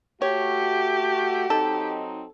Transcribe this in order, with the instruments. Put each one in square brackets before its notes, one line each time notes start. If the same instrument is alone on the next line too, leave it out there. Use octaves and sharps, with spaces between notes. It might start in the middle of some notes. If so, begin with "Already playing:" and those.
[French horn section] A3 F#4 [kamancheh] G4 [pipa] C#5
[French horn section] F#3 C4 D#4 [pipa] A4